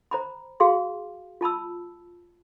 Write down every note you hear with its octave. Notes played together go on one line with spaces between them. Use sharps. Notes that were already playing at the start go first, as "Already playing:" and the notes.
C5 A#5 B5
F#4 G#4 F5 C6
F4 A5 B5 E6